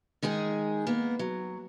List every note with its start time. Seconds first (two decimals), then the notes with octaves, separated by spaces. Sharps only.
0.22 D#3 G#3 D#4 G#4
0.87 A#3 B3
1.19 F#3